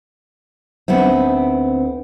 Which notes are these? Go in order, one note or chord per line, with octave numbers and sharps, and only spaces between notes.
D2 B3 C4 D#4 E5